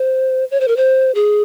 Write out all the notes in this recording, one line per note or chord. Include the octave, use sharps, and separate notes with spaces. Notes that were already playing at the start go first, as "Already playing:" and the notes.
Already playing: C5
C#5
C5
A#4
C5
G#4